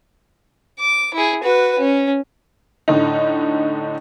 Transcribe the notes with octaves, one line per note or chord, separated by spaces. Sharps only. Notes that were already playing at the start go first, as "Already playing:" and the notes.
D6
E4 G#4
F#4 B4
C#4
A2 D3 D#4